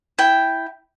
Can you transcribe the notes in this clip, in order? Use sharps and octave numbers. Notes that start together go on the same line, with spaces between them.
E4 G5